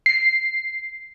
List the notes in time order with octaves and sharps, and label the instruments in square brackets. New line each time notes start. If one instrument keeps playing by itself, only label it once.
[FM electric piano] C7